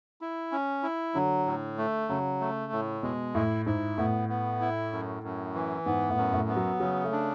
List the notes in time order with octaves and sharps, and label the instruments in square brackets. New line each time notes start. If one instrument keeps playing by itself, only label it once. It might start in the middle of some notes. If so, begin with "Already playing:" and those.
[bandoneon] E4
C#4
E4
[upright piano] D3 [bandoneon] F#3
[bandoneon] A2
A3
[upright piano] C#3 [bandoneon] F#3
[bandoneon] A3
A2
[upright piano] B2 [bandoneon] G#3
[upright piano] A2 [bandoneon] E4
[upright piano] G#2 [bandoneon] E4
[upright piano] A2 [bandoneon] B3
[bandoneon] B3
E4
F#2
F#2
E3
[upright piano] G#2 [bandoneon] B3
[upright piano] A2
[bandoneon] F#2
[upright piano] A2
[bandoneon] B3
[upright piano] F#3
[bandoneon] C#3 [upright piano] F#3
[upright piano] A3
[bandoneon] D4